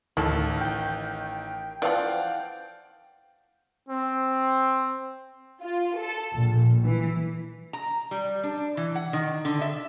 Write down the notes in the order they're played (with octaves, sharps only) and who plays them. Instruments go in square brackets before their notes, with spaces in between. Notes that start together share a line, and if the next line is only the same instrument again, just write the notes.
[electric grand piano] A1 D#3 [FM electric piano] D2 [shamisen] E4 A4
[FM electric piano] G5 G6
[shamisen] E3 F3 [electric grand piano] D5 F5 F#5
[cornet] C4
[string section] F4
A4
A#1
E3
[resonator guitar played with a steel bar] A#5
G3
D4
E3
F#5
D#3
D3
E5